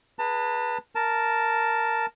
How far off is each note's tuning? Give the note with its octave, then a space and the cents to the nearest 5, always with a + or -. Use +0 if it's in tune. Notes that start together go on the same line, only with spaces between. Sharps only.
G#4 +0 B4 -20 A5 +35
A#4 -5 A5 +0